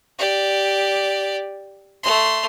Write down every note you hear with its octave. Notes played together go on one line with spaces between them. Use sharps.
G4 D5
A3 C6